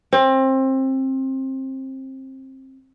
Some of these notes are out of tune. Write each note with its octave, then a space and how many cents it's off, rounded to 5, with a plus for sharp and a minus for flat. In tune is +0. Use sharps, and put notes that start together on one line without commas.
C4 +25